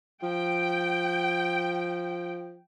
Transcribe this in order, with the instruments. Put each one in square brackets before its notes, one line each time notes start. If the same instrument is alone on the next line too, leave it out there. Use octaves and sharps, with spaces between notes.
[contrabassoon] F3 [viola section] G5